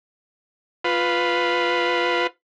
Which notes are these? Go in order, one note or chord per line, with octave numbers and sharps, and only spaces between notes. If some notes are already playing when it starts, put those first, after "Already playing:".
F4 B4